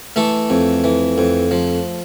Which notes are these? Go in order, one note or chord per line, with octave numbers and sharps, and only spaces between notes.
E3 A3 A4
F2
E3
F2
F3